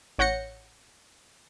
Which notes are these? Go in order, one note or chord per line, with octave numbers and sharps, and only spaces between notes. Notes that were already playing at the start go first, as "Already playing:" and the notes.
A1 C#5 F#5 G6 A#6 C#7